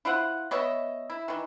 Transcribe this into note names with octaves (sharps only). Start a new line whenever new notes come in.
E4 F4 C5 F#5
B3 C#5 D#5 E5
E4
D#3 E3